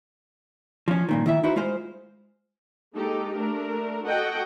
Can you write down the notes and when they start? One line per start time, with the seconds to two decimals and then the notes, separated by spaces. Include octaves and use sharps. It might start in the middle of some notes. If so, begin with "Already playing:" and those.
0.88 F3 C#4
1.09 G2 A#2 D#3
1.26 D#3 E4 E5
1.43 D#4 E4 F#4 B4 C5
1.56 G#3 F4 C5
2.95 G#3 A#3 D#4 G4 A4
3.35 A3 D4 A#4
4.05 F#4 A4 D#5 F#5 G5